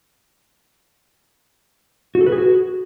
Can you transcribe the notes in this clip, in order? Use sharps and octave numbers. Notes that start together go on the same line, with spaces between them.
F#4
A4
B4
G#4
F#4